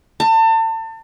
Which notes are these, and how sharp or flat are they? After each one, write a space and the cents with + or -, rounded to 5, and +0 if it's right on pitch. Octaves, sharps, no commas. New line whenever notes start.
A5 +35